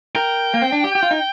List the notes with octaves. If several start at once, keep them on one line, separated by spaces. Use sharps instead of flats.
A#4 G5
A#3
C4
D4
G4
G4
F4
D#4